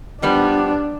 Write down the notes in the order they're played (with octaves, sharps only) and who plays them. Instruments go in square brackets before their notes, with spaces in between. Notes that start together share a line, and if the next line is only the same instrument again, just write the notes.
[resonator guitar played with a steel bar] F3 G3 B3 [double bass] D4